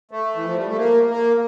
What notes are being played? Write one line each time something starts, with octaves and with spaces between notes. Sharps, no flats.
A3
E3
F3
G3
A3
A#3
A#3